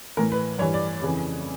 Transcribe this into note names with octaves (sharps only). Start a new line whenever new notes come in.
A2 E3 A#4
B4
G2 E3 C#5
D5
F2 C#3 E3